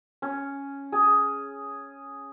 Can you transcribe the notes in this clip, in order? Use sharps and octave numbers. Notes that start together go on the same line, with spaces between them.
C#4
G#4